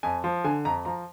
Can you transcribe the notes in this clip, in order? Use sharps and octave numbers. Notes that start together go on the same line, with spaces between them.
F2 G#5
F3
D3 G#5
F2 A#5
F3 A#5